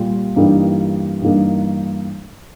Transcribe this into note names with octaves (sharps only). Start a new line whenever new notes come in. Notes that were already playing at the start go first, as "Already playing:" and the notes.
Already playing: A#2 G3 F4
G2 E3 G3 A#3 D#4
G2 E3 G3 A#3 D#4